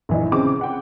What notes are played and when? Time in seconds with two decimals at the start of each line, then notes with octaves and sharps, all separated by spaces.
0.09 A#1 E3 D#4
0.32 C#3 C4 D6
0.61 F#5 G5